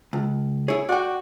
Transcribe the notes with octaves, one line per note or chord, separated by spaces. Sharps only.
C#2
E4 G#4 C#5
F#4 D5 G5